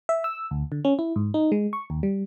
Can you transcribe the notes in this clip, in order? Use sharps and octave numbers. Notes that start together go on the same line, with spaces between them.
E5
E6
D2
D3
C#4
E4
G#2
D#4
G#3
C#6
D#2
G3